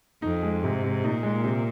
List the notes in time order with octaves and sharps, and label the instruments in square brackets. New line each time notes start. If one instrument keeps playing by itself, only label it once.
[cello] F2 [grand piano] D#4
[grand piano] G#3
[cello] G#2 [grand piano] C3
[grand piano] C3
[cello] A#2 [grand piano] D#4
[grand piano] G#3
C3